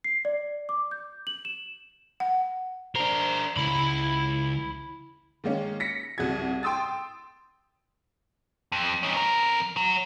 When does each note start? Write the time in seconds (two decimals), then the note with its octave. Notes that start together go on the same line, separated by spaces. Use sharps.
0.04 C7
0.25 D5
0.69 D6
0.91 G6
1.27 F#7
1.45 E7
2.20 F#5
2.96 D4 A#4 C5
3.57 C#2 E4 B5
5.44 D#3 G#3 A#3 C#4
5.80 A#6 B6 C#7
6.18 C2 C#3 F#4 G#6
6.63 G5 C6 D#6 E6 A6
8.72 F2
9.03 C#4 D#4
9.17 F2 A#4
9.77 F#3